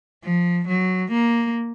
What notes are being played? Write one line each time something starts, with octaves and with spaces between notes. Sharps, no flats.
F3
F#3
A#3